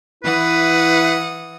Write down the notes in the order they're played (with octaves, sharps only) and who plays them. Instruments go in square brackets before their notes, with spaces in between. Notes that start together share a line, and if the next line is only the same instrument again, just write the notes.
[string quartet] E3 F#5 D#6 [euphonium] E4 [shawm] B4